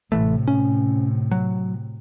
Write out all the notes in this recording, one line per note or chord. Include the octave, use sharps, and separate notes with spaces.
A1 A2 C3 E3 A3
C#4
F#3